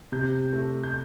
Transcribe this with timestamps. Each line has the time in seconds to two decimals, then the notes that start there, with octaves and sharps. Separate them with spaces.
0.12 C3 G6
0.53 A3
0.83 G6